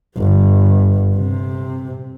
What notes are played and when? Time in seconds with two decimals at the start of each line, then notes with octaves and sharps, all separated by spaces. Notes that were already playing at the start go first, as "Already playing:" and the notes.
0.17 G1
1.16 C3